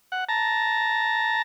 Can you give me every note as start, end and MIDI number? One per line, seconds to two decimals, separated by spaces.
0.12 0.24 78
0.29 1.42 81
0.29 1.42 82